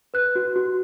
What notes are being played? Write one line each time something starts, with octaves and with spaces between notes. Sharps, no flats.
B4 F#6
F#4
F#4